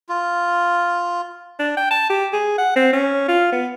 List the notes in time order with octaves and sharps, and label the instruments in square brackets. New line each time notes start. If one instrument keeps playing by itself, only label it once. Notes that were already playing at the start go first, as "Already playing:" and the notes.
[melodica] F4
[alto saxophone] D4
G5
A5
G4
G#4
F#5
C4
C#4
F4
B3